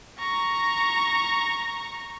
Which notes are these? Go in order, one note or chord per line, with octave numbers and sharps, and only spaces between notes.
A#5 C#6